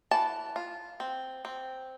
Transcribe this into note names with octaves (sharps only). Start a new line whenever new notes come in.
E3 A5
F4
C4
C4